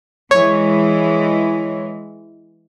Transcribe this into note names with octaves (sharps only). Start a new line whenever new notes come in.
E3 G#3 C#5